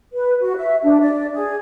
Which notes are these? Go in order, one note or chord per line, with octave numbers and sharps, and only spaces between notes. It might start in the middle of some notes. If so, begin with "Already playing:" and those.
B4
F#4
E5
D4
D5
G#4